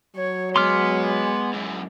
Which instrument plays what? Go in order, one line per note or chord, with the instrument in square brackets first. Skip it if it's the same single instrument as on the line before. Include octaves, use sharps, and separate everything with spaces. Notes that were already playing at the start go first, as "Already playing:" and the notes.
[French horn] F#3 [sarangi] C#5
[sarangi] G#3 [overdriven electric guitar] B3 [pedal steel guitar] C6 D6 F6
[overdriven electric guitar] F#2 E3